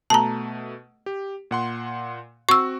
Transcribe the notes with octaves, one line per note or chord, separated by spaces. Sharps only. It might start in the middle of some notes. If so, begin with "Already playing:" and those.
B2 A3 A5 A#5
G4
A#2 F#5 C6
C4 F#4 C#6 E6